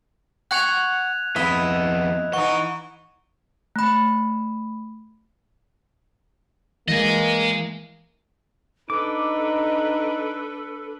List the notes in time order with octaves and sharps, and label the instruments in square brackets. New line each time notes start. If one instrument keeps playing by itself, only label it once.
[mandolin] F#5 C#6 [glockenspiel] F#6 G#6 F7
[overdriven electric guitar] F2 B3 [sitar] E4 [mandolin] D#5 B5
[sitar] E3 D#4 [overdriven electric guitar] F#5 [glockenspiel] C#6
[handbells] A3 B5
[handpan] E3 G#3 [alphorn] A#3 [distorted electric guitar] D#5 G#5
[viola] D4 B4 [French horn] D#4 [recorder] A4 [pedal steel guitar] D6